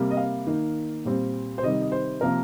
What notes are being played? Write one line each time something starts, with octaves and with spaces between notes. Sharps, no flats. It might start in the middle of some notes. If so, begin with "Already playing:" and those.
Already playing: C3 G3 A#3
D#5
F5
D#3 A#3
A#2 G3 C4
C5
C3 D#3 G3 D#5
D#5
C5
C3 F3 A#3 A#4